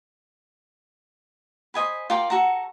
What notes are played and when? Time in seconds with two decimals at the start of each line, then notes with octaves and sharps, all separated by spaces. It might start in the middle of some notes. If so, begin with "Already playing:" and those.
1.74 C5 D#5 G#5 B5
2.10 F4 A#4 D5 G5
2.30 F#4 A4 A#5